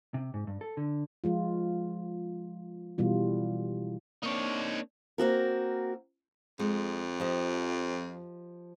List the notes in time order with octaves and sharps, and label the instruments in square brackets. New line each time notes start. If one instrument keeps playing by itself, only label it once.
[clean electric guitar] C3
G#2
G2
A4
D3
[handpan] F3 G#3 F4
B2 E3 G3 F4
[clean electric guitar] A#3 C4 D4 [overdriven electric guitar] D#4 C#5
[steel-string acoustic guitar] A#3 C4 F#4 A#4
[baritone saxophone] F2 [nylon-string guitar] G#3
[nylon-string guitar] F3 G4 D#5